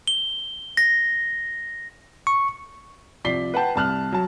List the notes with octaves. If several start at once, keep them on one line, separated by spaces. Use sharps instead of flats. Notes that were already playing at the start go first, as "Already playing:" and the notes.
G7
A#6
C#6
C2 F3 D5 B6 C7 G7
B4 F#5 G5 A5 G6
C2 G3 A5 F6 F#6
F#3 A5